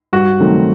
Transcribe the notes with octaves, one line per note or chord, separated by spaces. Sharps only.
G2 F#4
D#3 F#3 A3 C4